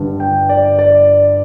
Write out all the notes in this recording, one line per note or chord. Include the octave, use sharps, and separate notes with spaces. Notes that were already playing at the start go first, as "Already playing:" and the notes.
Already playing: G1 G2 D3
G5
D5
D5